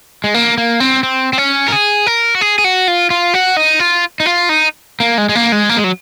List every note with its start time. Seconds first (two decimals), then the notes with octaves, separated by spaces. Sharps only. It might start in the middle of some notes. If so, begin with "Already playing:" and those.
0.24 G#3
0.34 A#3
0.58 A#3
0.80 C4
1.03 C4
1.33 C4
1.38 C#4
1.68 A#4
1.72 G#4
2.07 A#4
2.35 F#4
2.41 G#4
2.59 G#4
2.64 F#4
2.88 F4
3.10 F4
3.34 F#4
3.57 D#4
3.80 F4
4.20 D#4
4.26 F4
4.49 D#4
5.00 A#3
5.18 G#3
5.29 G#3
5.35 A#3
5.52 G#3
5.69 A#3
5.77 G#3
5.84 F#3